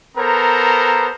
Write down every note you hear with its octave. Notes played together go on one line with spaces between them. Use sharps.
B3 A4 A#4 C5 A#5